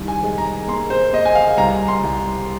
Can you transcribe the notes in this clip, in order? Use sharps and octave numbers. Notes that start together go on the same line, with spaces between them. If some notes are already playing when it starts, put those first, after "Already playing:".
Already playing: C2 D#3
G#5
G#3
A#5
A#3 C6
C5
A#3 D#5
G#5
F5
C2 A#5
C6
C2